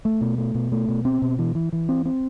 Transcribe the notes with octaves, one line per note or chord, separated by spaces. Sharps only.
A3
B2
A3
B2
A3
B2
C4
B2
E3
E3
E3
C4
C4